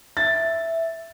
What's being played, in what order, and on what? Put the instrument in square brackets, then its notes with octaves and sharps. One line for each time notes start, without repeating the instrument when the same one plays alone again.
[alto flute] E5 [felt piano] A6